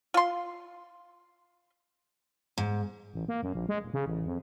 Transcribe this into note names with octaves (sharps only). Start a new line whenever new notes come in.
F4 C6
G#2
A1
A#3
F#2
A#1
G#3
D#1
C#3
A1
F2